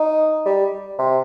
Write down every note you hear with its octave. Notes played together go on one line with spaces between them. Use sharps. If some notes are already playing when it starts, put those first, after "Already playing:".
Already playing: D#4
G3
C3